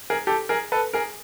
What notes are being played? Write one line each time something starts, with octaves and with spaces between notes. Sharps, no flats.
G#4 A#4
G4 A4
G#4 A#4
A4 B4
G#4 A#4